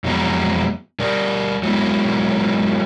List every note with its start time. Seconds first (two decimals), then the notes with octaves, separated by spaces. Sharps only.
0.04 F2 E3 F#3 G#3 B3 A#5
0.99 G3 A#4 D5
1.63 F#3 G#3 A#3 B3 E4